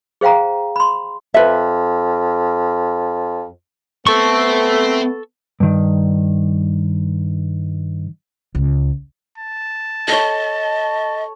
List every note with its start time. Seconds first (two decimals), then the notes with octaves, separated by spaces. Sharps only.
0.21 G#4 C5 F5 G5 A#5
0.76 B5 C6
1.34 F2 B4 E5
4.07 A3 B3 C4 A4 C#6
5.60 G2 D#3
8.55 C#2
9.38 A5
10.08 A4 C#5 D#5